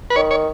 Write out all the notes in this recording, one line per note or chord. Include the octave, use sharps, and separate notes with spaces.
B4
D#3 C#5
C#5